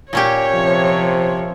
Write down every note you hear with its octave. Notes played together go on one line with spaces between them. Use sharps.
A#2 C#4 G4 C#5
C3 F3